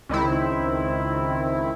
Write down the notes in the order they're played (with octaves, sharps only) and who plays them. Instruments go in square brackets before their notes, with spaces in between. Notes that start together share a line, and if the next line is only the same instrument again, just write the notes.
[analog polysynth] C#2 D#3 C4 E4